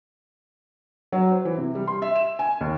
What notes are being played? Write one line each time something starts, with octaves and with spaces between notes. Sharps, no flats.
F#3
C5
E3
C3
G3
C6
E5
E7
G#5
D#2